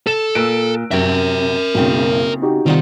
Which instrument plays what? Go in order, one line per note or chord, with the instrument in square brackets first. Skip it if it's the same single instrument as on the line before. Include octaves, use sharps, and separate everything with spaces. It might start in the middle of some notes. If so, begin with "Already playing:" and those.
[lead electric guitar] A4 [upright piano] E7
[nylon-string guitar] A#2 [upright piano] E6 F#6 D7
[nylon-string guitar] F#2 C3 [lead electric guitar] A#4 E5
[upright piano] F#1 B1 [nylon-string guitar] C#3 C4 E4
[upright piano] D#4 F#4 G4
[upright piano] C3 [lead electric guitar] D#3 [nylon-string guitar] G3 F4 F#5